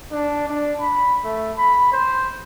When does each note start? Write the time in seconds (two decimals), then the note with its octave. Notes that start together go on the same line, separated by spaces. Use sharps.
0.12 D4
0.49 D4
0.80 B5
1.24 A3
1.58 B5
1.92 C5